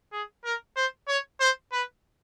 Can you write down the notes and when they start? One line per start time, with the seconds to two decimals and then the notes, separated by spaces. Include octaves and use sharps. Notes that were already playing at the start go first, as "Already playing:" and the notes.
0.12 G#4
0.45 A#4
0.76 C5
1.08 C#5
1.40 C5
1.72 B4